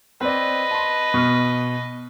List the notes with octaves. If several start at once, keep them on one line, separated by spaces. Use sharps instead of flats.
C4 B4 D5 D#5
A5 C6
B2 C#6 F6